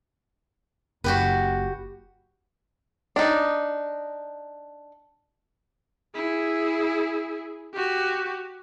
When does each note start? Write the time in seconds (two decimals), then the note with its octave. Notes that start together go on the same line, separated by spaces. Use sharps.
1.04 F#1 F#4 G4 B4
3.16 D4 D#4
6.15 E4 G#4
7.74 F#4 G4